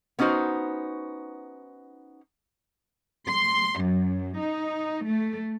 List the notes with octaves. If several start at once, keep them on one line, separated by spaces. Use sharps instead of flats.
B3 C#4 D#4 F#4 C5
C6
F#2
D#4
A3